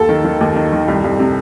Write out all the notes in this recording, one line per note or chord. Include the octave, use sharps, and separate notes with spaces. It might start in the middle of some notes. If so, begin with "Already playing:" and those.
Already playing: D#2 A4
D#3
D#3
D#2
D#3
D#3
C2
C2
C3